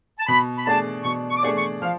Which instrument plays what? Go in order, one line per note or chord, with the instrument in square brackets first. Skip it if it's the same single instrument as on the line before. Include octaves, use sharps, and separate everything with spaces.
[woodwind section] A5
[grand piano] B2 [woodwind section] B5
[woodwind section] B5
[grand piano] A3 D4 G#4 D5 [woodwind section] A5
[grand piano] B2 [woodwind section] C#6
[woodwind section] C#6
D6
[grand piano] A3 D4 G#4 D5 [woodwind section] C#6
[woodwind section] C#6
[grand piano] F3 [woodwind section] F5